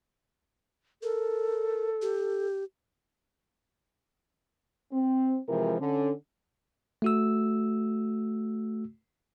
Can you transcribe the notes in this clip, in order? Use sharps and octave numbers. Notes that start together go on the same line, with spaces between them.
A4 A#4
G4
C4
C3 E3 F3 G#3 C4 A#4
D3 C#4
A3 F#4 E6